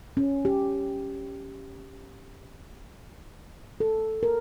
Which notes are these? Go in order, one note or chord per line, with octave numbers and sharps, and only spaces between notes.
C#4
G4
A4
A#4